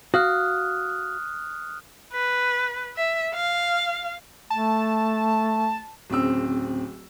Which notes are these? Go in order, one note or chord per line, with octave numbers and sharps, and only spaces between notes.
F#4 F5 D#6 F6 F#6
B4
E5
F5
A3 A5
D1 C#3 C4 E6